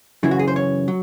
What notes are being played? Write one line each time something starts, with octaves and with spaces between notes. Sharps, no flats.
F#2 C#3 E3 E4
F#4
G#4
C5
C#5
F#3